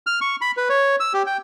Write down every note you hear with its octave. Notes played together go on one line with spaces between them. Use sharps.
F6
C#6
B5
B4
C#5
E6
G4
G5